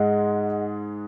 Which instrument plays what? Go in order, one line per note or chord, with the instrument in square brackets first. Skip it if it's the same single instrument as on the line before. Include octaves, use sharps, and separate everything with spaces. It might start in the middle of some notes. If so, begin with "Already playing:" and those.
Already playing: [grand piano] G#2 G#3 [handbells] G#4 D#5 F#5